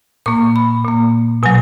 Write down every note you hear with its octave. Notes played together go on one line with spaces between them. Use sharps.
A#2 A#3 C#6
B5
A#2 A#3
B2 F#3 G#5